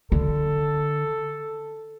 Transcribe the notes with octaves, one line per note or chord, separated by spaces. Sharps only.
D3 A4